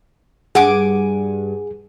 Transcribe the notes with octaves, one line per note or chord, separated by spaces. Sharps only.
G2 G#4 F#5 G#5 D6